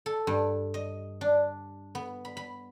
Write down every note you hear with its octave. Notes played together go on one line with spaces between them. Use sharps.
A4
G2
D#5
D4
B3
B5
B5